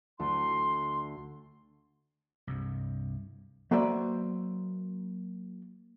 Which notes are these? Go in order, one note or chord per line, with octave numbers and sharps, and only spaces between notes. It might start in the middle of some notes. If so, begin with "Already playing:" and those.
D2 C6
C2 G2
F#3 A#3 B4 C5 D5 E5